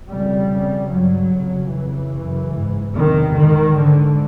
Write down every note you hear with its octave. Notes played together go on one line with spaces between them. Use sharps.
F2 C#3 G3
F2 C#3
G2 F#3
F2 C#3
F2 C#3 E3
F#2 C#3
G#2
E2 C3 D#3
G#2 D#3
G#2 D3